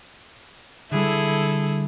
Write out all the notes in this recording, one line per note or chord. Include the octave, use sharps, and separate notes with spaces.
D3 G3 E4 G#4 A4